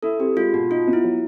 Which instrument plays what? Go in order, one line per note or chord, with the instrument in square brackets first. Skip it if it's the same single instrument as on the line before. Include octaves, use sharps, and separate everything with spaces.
[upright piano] E4 [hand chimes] A4
[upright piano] C4 [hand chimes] G4
[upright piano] G#3 [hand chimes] F4
[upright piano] B2 [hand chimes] F#4
[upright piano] D#4 [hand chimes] F4
[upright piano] B3
[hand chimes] E4
[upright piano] F#3